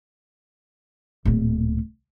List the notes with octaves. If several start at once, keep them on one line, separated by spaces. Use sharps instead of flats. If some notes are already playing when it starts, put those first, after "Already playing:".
D1 A#2